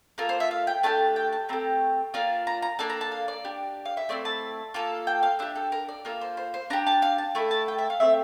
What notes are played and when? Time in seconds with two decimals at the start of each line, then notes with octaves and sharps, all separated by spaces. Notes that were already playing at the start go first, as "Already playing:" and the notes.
0.18 A#3 F4 A4 A#4
0.29 C5
0.40 E5
0.51 F5
0.67 G5
0.83 A3 D4 G4 A5
1.16 G5
1.33 A5
1.49 A3 C4 G4 A#5
2.14 A#3 D4 F4
2.47 A#5
2.62 A#5
2.79 A#3 D4 A4 A5
2.90 A#5
3.01 A5
3.12 F5
3.28 D5
3.45 D4 G4
3.85 F5
3.97 E5
4.09 A3 C4 E4 D5
4.25 A5
4.74 A#3 F4 A4
5.07 G5
5.23 F5
5.39 D4 G4 E5
5.55 A4
5.72 A#4
5.89 D5
6.05 A#3 F4 A4 A#4
6.21 C5
6.37 C5
6.54 C5
6.70 D4 G4 A#5
6.86 A5
7.02 F5
7.18 A5
7.35 A3 E4 A4
7.51 A5
7.68 G5
7.78 E5
7.90 F5
8.00 A3 C4 G4 E5